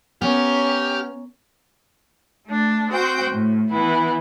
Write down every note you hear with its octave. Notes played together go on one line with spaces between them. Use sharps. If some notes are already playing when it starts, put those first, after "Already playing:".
B3 C#4 G4 A#4 F6
A3 D4
C4 F#4 C5 G5
A2
E3 B3 E4